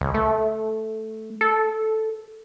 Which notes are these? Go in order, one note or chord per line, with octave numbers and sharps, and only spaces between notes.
C#2
A3
A4